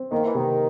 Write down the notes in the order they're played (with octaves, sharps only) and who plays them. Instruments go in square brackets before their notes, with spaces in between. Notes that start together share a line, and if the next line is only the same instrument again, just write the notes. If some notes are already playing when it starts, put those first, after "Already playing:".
Already playing: [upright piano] C4
[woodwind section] D#3 [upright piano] A#3
[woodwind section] E3
[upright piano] C3 [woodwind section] D#3